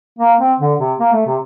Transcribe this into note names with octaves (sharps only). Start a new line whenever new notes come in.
A#3
C4
D3
C3
A#3
A3
C3